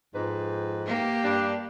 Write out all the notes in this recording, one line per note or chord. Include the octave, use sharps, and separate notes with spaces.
F2 G#2 B4
A#3 G4
G2 D4